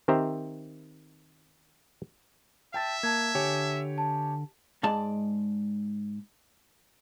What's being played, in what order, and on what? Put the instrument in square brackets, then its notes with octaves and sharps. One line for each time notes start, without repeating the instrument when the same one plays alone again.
[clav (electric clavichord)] D#3 C4 G4 C5 E5 A#5
[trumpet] E5 [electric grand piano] G5 A5 A6
[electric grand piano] A#3 [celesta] A5 G#6
[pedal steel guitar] D3 [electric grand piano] G4 C#5 G#5
[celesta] A5
[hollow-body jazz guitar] G#2 G#3 D5 A5